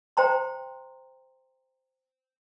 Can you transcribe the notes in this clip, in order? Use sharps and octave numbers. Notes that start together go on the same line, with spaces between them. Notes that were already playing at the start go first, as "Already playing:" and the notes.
C5 G5 A#5 C6